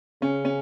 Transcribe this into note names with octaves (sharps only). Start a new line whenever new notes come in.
C#3 C#4
C#4